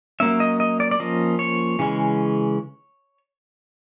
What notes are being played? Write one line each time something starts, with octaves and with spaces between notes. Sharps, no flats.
F#3 A#3 C#4 E5
D#5
D#5
D5
D5
F3 A#3 C#4 D#5
C#5
C#3 E3 G#3 C#4